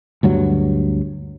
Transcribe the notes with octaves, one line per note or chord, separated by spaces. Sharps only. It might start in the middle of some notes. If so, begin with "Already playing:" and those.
D2 G2 F#3